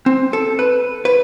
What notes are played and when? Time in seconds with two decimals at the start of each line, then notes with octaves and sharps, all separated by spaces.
0.06 C4
0.33 A4
0.59 B4
1.05 B4